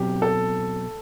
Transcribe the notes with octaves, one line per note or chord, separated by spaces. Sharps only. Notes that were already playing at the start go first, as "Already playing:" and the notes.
Already playing: B2 F#3 C4 G4
A4